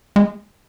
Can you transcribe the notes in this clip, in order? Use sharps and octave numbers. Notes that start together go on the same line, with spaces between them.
G#3